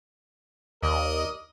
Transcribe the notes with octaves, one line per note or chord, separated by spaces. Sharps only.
D#2 A#4 D5 D#5